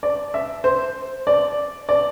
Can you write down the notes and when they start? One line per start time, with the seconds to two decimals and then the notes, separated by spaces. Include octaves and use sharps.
0.03 D5
0.34 E5
0.64 C5
1.27 D5
1.89 D5